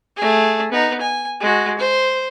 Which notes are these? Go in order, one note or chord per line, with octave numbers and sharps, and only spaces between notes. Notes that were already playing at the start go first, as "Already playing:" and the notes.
A3 G#4
B3 D#4
G#5
G#3 F#4
C5